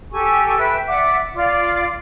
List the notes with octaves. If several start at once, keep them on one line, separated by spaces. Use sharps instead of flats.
G4 A4 G#5 C#6
B4 E5 G5
D5 E5 F#5 D6
F4 D5 F5 D6